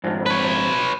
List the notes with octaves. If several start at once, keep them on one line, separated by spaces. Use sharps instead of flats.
F2 G#2
B4 C#5